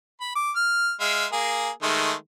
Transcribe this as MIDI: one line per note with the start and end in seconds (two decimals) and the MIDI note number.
0.21 0.33 83
0.36 0.51 86
0.56 0.94 89
1.00 1.26 56
1.00 1.26 76
1.00 1.26 77
1.33 1.70 58
1.33 1.70 68
1.83 2.13 51
1.83 2.13 56
1.83 2.13 57